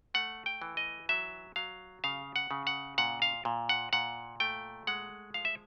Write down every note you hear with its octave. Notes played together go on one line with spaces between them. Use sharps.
A3 F#5
G5
E3
D#5
F#3 E5
F#3 F5
C#3 F5
F#5
C#3
F#5
A#2 F#5
F5
A#2
F#5
A#2 F#5
A3 G5
G#3 F#5
F3 F5
E5